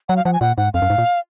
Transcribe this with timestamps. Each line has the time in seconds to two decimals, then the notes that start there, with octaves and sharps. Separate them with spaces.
0.09 F#3 F#5
0.17 F5
0.25 F3 F#5
0.33 G#5
0.41 A#2 F#5
0.58 G#2 F#5
0.74 F2 F5
0.82 F#2
0.90 G#2
0.98 A#2